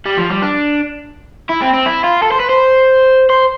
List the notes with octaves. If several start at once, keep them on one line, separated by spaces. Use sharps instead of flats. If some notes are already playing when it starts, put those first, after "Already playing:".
G3
F3
G3
D4
E4
C4
C4
E4
F4
A4
C5
B4
C5
C5